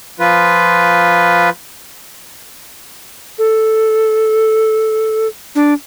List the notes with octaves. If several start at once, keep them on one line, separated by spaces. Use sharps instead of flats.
F3 F4 B4
A4
D4